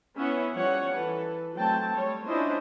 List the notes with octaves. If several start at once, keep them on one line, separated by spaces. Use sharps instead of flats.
B3 C#4 E4 E5 F#5
F3 G3 C#4 C#5 F#5
E3 A4 B4
F#3 A3 C4 G5 A5
G3 A3 C#5
C#4 D4 E4 F4 C5 D#5